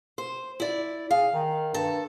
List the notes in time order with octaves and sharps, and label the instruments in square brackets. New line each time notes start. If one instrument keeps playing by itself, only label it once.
[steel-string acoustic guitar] C5
E4 D5
[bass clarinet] G#4 [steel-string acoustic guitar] F5
[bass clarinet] D#3
[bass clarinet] G2 [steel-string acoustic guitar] A4